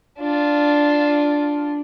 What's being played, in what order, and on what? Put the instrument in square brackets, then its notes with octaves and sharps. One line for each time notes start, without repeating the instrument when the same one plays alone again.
[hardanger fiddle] D4 F4